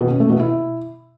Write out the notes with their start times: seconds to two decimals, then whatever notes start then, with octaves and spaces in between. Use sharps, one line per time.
0.01 B2
0.10 C#4
0.20 A3
0.30 B2
0.39 E4